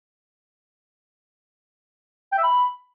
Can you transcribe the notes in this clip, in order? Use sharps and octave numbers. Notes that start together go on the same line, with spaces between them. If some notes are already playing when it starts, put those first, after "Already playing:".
G5
E5
B5